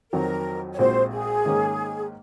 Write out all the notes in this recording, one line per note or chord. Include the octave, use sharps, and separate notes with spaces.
F2 D#3 F#3 C4 F#4 A#4
C#5
A#1 A#2 G#3 C4 F#4 C5
G#4
G#2 D#3 A#3 C#4